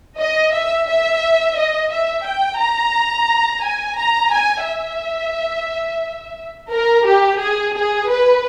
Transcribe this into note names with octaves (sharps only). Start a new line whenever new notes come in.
D#5
E5
E5
D#5
E5
G5
A#5
G#5
A#5
G#5
E5
A#4
G4
G#4
G#4
B4